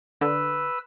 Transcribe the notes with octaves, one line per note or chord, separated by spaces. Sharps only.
D3 B4 E6